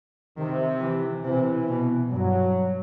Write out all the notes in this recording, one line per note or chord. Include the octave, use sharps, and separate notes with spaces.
C3 D#3
E3
C3 E3
B2
G2 F#3